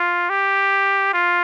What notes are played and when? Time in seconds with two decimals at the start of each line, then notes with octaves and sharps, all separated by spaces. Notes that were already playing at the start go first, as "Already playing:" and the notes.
Already playing: F4
0.29 G4
1.14 F4